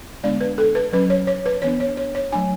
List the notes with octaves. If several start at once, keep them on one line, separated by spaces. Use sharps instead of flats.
D3 G#3 B3 D4 D5
B4
A4
B4
F#3 C#4 B4
C#5
C#5
B4
E3 B3 D4 C#5
C#5
C#5
C#5
F#3 A3 D4 G#5